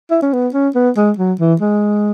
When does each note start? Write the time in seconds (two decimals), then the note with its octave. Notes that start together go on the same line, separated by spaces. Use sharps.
0.11 E4
0.22 C#4
0.33 B3
0.54 C#4
0.75 B3
0.97 G#3
1.18 F#3
1.40 E3
1.61 G#3